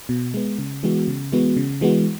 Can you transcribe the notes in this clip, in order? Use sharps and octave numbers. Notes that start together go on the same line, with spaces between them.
B2
G#3 B3
C#3
E3 G#3 B3 F#4
C#3
E3 G#3 B3 F#4
C#3
E3 G#3 B3 F#4